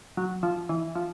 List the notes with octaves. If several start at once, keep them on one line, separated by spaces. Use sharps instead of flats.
F#3
F3
E3
F3